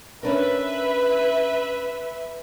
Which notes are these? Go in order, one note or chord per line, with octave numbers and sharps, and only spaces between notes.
C#4 D4 A#4 B4 E5